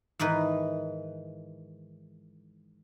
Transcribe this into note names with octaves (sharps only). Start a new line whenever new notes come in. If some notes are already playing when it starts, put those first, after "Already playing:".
G#2 D#3 E3 A#4 B4